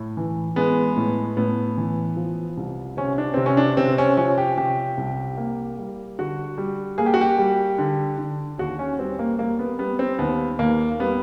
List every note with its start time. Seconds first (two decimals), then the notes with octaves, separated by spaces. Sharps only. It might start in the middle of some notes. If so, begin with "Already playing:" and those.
Already playing: A2
0.17 E3
0.56 G#3 B3
0.97 A2
1.37 A2 B3
1.77 E3
2.17 F3
2.57 C2
2.97 C3 C#4
3.18 D4
3.34 C3 C4
3.46 C#4
3.57 D4
3.77 C3 C4
3.98 C#4
4.17 F3 C#4
4.38 G4
4.57 C3 G4
4.97 C2
5.37 A#3
5.78 G3
6.19 D3 F#4
6.58 G3
6.98 A#3 G#4
7.06 G4
7.14 F#4
7.21 G4
7.38 G3
7.79 D3
8.18 D3
8.58 D#2 F#4
8.79 C#4
8.99 G3 C4
9.19 A#3
9.38 G3 A#3
9.59 B3
9.79 G3 B3
9.99 C4
10.19 D#2 B3
10.59 D#2 A#3
11.00 G3 B3